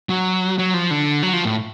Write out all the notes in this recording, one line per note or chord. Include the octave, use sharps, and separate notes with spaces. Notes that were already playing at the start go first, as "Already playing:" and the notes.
F#3
F#3
F3
D3
F#3
F3
A2